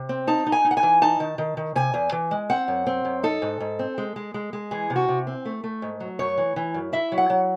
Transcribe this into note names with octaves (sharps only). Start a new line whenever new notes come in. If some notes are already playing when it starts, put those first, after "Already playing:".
Already playing: C3
C4
D#4 A5
D#4
G#5
D#4
F#5
G#5
E3
D#4 A5
D#3
D#3
D#3
C3 G#5
E2
E3
G#3
C4 F#5
F#2
C4
F#2
D#4 A4
G#2
G#2
C4
G#3
G#3
G#3
G#3
E3 G#4
C3
F#4
C3
C4
A3
A3
G#2
F#3
F#2 C#5
E3
E3
F#2
E4 E5
F#3
F#5
F#3